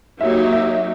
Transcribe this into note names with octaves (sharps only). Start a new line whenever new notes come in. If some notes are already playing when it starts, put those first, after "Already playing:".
F#3 A#3 D#4 G4 E5
E5